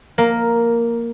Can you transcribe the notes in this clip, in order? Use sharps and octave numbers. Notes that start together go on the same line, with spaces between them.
A#3